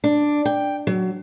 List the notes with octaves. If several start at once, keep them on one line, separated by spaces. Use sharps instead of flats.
D4
G5
F#3